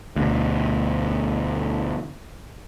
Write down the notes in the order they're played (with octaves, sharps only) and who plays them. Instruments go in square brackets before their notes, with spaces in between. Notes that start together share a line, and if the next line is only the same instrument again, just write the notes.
[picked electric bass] D2 B2